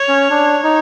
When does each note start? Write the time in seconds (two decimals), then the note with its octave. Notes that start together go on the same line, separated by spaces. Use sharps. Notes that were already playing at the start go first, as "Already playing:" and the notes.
Already playing: C#5
0.08 C#4
0.30 D4
0.63 D#4